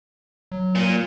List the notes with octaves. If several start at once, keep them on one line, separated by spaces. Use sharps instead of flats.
F#3
A#2